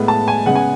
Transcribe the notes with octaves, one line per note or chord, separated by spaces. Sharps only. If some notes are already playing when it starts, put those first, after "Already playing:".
Already playing: A2 G#3 B3
A5
G#5
C#3 G#3 B3 F#5
G#5